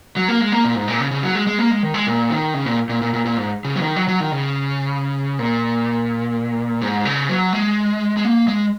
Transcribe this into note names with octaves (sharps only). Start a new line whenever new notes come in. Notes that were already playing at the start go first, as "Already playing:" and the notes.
F#3
A#3
G#3
A#3
A#2
G#2
A#2
C#3
C#3
F#3
G#3
G#3
A#3
G#3
D#3
G#3
A#2
D#3
C#3
A#2
A#2
A#2
A#2
A#2
G#2
C#3
F#3
D#3
F#3
F#3
D#3
C#3
A#2
G#2
C#3
F#3
G#3
G#3
A#3
G#3